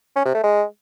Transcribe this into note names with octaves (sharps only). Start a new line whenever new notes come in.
C#4
C3
A3
G#3